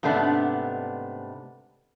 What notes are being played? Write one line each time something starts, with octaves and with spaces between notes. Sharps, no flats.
G#2 C3 A3 B3 D4